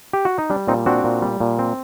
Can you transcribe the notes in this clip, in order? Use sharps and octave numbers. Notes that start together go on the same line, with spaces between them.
G4
F#4
D#4
G3 D4
A#2 C4 D#4
C4 D4 F#4
A#2
G3
A#2
C4